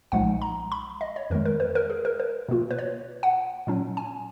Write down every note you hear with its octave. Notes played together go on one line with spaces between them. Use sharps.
B1 A#2 F3 G#3 D#4 F#5
A#5
B5
D#5
C#5
F2 D#3 G#3 A#4
A#4
B4
A#4
G#4
A#4
B4
B2 A#3 F4
B4
C#5
F#5
A#2 F#3 C#4
G#5